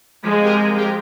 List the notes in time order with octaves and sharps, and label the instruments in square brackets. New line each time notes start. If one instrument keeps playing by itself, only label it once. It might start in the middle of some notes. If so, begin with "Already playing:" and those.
[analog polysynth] F3 [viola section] G#3
[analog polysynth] C4 G4 A#4
F3
C4 G4 A#4